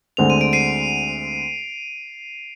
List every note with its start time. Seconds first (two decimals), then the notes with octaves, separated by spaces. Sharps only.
0.17 D2 D3 G#3 C4 F7
0.30 D#7
0.41 D7
0.53 C7 D#7